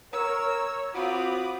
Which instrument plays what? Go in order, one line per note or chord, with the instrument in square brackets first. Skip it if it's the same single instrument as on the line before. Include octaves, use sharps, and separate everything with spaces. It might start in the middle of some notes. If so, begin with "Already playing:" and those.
[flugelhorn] A#4 [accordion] C#5 [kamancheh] E6
[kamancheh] C4 F4 [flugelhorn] F#4 [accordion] B5 D6 D#6